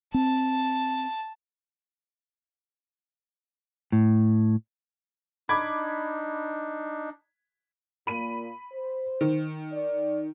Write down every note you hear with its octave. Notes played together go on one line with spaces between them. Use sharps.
C4 A5
A2
D4 D#4 B5 D6 G#6
A#2 A#3 B5 D#7
C5
D#3
D5